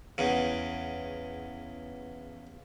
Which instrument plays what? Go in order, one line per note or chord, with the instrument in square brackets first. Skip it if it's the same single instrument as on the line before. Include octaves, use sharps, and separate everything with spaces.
[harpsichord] E2 C#3